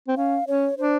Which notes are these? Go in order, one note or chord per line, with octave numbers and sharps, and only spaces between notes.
C4
C#4 F5
C#4 C#5
D4 C5